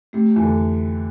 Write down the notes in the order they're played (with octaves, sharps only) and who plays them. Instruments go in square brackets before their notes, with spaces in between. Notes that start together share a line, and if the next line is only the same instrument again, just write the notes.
[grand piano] C3 [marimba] A3
[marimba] F2 [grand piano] E3
[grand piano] D3